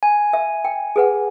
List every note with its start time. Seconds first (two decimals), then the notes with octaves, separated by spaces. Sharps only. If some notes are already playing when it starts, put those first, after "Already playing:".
0.03 G#5
0.33 E5
0.65 G5
0.96 G#4 B4 F#5